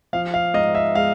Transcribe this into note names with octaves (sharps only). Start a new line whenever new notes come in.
F3 F5
F5
G#2 D#5
E5
G#3 F5